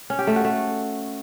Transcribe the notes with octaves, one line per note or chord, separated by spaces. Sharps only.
C#4
G4
A3
F#4
A3